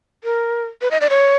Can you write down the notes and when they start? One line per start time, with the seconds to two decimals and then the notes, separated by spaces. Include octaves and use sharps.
0.24 A#4
0.81 B4
0.91 D#5
1.01 D5
1.10 C#5